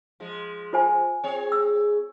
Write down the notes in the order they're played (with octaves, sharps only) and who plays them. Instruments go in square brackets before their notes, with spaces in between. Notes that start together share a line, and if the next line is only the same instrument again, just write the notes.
[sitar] F3 G#3
[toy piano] F4 C5 G#5
[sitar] C4 G#4 C#5
[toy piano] E6